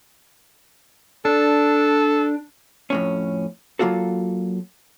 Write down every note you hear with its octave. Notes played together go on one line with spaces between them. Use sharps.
D4 A4
F2 A2 C#4
F#3 A#3 F4 F#4 A4